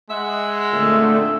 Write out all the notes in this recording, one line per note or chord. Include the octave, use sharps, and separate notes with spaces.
G#3 E5 F#5
A#2 D3 A3 C4 E5